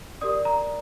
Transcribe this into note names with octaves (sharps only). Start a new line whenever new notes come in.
G4 A#4 D5 D#6
A#5